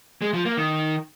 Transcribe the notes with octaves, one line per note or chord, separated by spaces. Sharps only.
G#3
F3
A#3
D#3